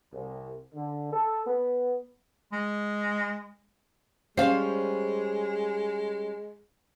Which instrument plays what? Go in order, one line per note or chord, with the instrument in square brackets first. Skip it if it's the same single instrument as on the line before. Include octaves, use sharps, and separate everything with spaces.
[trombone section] C2
D3
A4
B3
[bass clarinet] G#3
[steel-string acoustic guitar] G3 C#4 [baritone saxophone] G#3 [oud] C5 F5